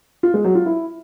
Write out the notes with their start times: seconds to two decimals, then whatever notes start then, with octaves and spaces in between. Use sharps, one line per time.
0.23 F4
0.34 G#3
0.44 F#3
0.55 F4
0.66 E4